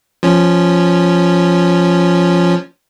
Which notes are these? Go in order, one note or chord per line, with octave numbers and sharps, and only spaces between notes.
F3 C#4